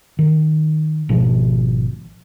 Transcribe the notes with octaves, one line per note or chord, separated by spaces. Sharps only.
D#3
G#1 B2 F3